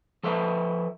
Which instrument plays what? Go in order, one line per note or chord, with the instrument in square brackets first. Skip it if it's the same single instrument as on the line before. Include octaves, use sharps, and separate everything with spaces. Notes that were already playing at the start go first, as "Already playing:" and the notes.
[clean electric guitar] F3 A4 B4 E5